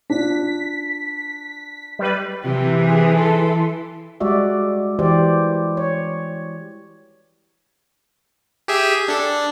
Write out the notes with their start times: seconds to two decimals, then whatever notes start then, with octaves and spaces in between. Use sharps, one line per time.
0.10 D4 F4 B6
1.99 G3 B4
2.44 C3 E3 G4
2.84 G#4
3.16 A4 C6
4.20 G3 G#3 F#4 D5 E5
4.99 E3 G4 C5 D5
5.77 C#5
8.68 G4 G#4 E5
9.08 D4 A4
9.20 D4